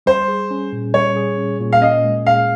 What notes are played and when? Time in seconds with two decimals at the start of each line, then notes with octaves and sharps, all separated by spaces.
0.06 G3 C5
0.28 G#4
0.51 C#4
0.73 A#2
0.94 G3 C#5
1.17 G#4
1.38 C#4
1.60 A#2
1.73 F5
1.82 C#4 D#5
2.04 G#3
2.25 G#4 F5